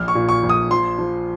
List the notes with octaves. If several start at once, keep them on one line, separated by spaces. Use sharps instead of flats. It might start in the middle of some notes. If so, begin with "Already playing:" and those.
Already playing: A#1 F6
C#6
A#2
C#6
A#1
D#6
F3 C6
F3